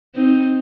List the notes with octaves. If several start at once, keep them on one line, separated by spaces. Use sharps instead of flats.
C4 D#4